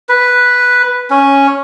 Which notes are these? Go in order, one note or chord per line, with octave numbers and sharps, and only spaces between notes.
B4
C#4